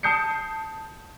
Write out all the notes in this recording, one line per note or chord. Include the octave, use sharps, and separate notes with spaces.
A5 D#6 G6 C7 C#7